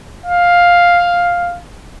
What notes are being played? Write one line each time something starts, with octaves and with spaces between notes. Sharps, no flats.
F5